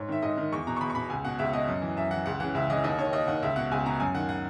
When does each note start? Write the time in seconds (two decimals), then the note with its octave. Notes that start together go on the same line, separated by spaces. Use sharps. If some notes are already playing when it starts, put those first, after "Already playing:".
Already playing: G#2 C#5
0.09 D#3 E5
0.22 G#2 D#5
0.37 D#3
0.52 E2 C#6
0.67 B2 A#5
0.77 C#6
0.81 E2 B5
0.90 C#6
0.95 B2 B5
1.10 C#2 G#5
1.25 B2 F#5
1.39 C#2 E5
1.53 B2 D#5
1.68 F#2
1.82 E3
1.96 F#2 E5
2.11 E3 F#5
2.26 C#2 F#5
2.40 C#3 E3 F#5
2.55 C#2 E5
2.69 C#3 E3 D#5
2.83 D#2 D#5
2.98 D#3 C#5
3.13 D#2 D#5
3.27 D#3 F#5
3.42 C#2 E5
3.56 B2 F#5
3.71 C#2 G#5
3.85 B2 A#5
4.00 F#2 G#5
4.15 D#3 F#5
4.29 F#5